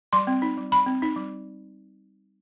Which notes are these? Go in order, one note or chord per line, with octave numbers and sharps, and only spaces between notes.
G3 C6
C4
D#4
G3
G3 B5
C4
D#4
G3